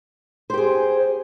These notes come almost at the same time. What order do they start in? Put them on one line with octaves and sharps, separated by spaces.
C5 G4 G#4